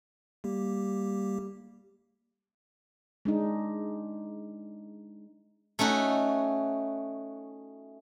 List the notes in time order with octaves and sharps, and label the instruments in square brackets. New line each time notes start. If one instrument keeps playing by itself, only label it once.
[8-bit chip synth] G3 A#3 G4
[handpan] G#3 D4 D#4
[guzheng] A3 C#4 D#4 F#4